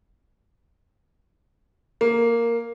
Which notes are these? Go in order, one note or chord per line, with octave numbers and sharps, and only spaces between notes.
A#3